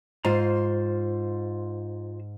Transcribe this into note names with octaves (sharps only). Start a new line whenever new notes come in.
G#2 F4 C5 A#5